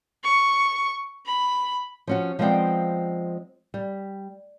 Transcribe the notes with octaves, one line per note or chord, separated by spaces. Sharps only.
C#6
B5
F3 C#4 F#4
F3 G#3 B3 C4 D5 G5
G3